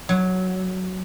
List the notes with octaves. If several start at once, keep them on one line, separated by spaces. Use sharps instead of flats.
F#3